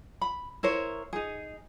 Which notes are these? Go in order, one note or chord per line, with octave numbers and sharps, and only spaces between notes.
B5
E4 A#4 C5 C#5
D#4 G#4